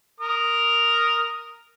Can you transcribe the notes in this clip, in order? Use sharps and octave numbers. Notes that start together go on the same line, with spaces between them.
A#4 D#6